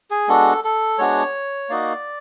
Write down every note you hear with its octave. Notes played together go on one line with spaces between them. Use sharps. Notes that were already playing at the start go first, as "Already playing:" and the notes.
G#4
G#3 B3 D4 F#4 A4
A4
G#3 B3 D4 F#4 C#5
A#3 D#4 F#4 D5